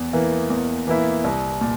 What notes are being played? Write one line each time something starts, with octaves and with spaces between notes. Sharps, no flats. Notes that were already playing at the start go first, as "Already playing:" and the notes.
Already playing: E2
E3 A#3 E4
E2
E3 A#3 E4
C2
A#2